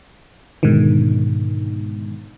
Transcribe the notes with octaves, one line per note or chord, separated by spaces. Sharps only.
G#2 B2 D3 D#3